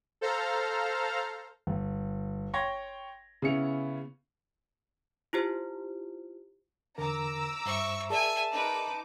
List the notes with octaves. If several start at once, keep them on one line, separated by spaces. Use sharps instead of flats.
A4 C5 F5 A#5 F6
G1
C#5 G5 C6 C#6 G#6 A#6
C#3 B3 C#4 E4 C#7 F7
E4 F4 G4 C5
E2 D3 A#4 A#5 D6 E6
G2 C5 E5 C#6
G#4 A#4 D5 E5 G#5 A5
D#4 B4 D6